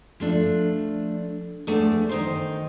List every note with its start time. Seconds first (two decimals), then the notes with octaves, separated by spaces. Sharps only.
0.20 F3 A3 D4
1.67 E2 F3 A3 D4
2.09 D#3 D#4 C5